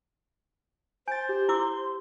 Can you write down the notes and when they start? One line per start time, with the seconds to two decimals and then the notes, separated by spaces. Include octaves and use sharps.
1.08 C5 G#5 G6 A6
1.29 G4
1.49 E4 C6 D6 E6